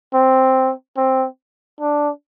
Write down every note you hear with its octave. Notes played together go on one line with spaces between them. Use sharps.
C4
C4
D4